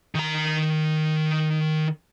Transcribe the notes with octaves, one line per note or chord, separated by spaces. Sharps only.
D#3 A#5